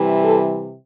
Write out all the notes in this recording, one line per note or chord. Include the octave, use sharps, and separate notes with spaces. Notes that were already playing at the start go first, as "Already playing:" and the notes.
Already playing: C3 E3 G3
A4